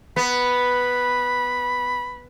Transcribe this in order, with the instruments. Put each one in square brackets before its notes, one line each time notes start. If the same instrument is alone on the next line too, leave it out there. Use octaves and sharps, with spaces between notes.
[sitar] B3 [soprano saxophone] B5